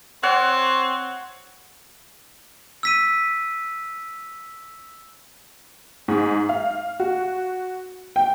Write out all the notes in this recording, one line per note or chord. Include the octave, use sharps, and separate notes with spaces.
C4 C#5 F#5
E6 B6 D#7
G#2
F5
F#4
G5